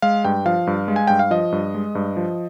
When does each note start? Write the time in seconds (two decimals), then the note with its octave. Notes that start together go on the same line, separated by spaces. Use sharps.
0.02 G#3 F5
0.24 G2 G5
0.46 F3 F5
0.67 G2
0.88 G#3
0.96 G#5
1.07 G2 G5
1.19 F5
1.31 F3 D#5
1.52 G2
1.74 G#3
1.95 G2
2.17 F3